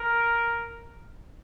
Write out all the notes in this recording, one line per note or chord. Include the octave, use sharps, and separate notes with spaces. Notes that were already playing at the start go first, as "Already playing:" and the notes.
Already playing: A#4